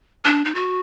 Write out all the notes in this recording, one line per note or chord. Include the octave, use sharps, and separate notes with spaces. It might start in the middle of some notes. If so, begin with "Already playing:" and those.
D4
D#4
F#4